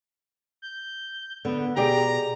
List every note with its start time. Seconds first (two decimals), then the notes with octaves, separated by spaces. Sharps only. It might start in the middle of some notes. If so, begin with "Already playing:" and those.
0.62 G6
1.45 D3 B3
1.77 B2 G4 G#4 D5 A#5